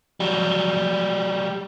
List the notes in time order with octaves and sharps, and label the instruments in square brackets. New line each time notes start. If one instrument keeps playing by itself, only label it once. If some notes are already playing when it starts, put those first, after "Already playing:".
[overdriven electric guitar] F#3 G3